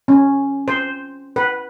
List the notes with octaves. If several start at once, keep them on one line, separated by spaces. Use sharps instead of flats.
C#4
C5
B4